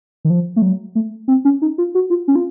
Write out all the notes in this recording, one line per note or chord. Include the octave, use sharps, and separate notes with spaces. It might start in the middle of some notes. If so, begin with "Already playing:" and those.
D#3
F3
A3
F#3
A3
C4
C#4
D#4
F4
F#4
F4
C#4
F4